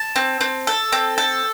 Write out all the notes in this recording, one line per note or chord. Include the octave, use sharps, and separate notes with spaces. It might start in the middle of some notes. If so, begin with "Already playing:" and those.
Already playing: A5
C4
C4
A4
C4
A4